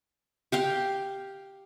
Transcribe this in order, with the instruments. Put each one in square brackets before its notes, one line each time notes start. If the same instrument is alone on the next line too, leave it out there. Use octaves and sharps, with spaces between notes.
[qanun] G4 F5 G5